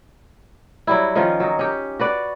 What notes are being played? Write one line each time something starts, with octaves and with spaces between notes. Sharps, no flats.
F#3 G3 E4
D#3 F3 C#4 F4
F#3 D#4
C#4 G4
F#4 B4 D5